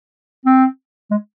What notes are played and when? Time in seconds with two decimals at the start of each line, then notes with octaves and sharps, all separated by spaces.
0.46 C4
1.11 G#3